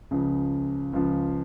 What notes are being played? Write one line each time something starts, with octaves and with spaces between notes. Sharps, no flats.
C#2 C#3 F3
C#2 C#3 F3